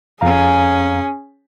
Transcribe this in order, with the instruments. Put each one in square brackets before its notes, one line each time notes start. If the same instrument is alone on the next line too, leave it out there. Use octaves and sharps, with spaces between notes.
[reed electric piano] F2 F5 A#5 [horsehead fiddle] C#4 G#4